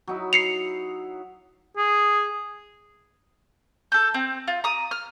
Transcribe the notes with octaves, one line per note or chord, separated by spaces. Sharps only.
F#3 D#4 E4
C7 C#7 F7
G#4
A4 G6
C4
F4
A#5 D#6
F6